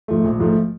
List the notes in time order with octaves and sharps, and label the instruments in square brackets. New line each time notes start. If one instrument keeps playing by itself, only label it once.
[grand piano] G#2 F3 A3
A#1
G#2 F3 A3